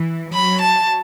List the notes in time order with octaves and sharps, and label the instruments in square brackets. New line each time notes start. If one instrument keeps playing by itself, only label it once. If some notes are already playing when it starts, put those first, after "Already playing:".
Already playing: [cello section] E3
[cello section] F#3 [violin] B5
[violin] A5